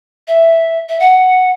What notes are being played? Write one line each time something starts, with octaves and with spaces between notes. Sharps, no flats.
E5
E5
F#5